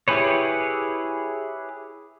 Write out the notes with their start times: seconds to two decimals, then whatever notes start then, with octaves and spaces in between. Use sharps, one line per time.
0.08 E4 G4 G#4 B4 C#5